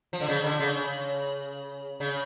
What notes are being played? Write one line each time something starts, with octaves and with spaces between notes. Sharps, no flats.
F3
D3
C#3
D3
C#3
C#3